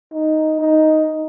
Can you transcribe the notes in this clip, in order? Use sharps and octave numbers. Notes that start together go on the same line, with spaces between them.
D#4
D#4